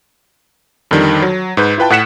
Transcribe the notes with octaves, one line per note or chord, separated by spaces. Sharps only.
F2 D3 D#3 G3
F#3
G#2 B4 G6
E4 F4 B4 G5 A5
A2 F#5 F#6 B6 C#7 E7